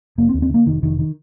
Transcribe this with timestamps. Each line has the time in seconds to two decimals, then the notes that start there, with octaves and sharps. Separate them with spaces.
0.18 F1 A#3
0.29 C4
0.34 D#2
0.42 C4
0.49 D3 A#3
0.66 F1 D#3
0.83 F1 D#3
0.99 D#3